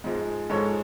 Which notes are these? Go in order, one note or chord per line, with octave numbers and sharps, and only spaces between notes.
G#2 F3 G#3
G#2 F3 G#3 A4 C#5